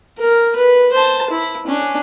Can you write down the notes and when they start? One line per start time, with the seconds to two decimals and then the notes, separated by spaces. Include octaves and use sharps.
0.18 A#4
0.56 B4
0.93 C5 A5
1.30 E4
1.67 C#4 D4